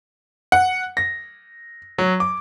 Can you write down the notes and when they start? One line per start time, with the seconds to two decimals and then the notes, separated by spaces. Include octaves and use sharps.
0.52 F#5
0.97 A#6
1.98 F#3
2.20 D6